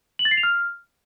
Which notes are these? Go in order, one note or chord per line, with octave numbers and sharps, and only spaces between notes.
F#7
A6
C7
F7
F6